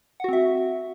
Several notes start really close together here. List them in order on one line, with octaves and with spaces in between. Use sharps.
F#5 F#4 C4 E5